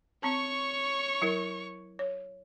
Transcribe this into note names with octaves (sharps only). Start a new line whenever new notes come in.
C4 C#5 A5 C#6
F#3 E4 A#4
C#5